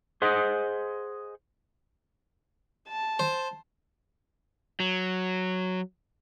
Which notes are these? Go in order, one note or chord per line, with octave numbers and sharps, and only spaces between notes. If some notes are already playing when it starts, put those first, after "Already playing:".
G#4 C5 D#5 F#5
A5
C5
F#3